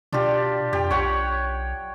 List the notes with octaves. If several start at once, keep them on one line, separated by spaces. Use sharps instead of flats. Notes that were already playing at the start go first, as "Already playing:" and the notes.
B2 D4 F4 G4
F2 G4
B1 C#5 F#5 G5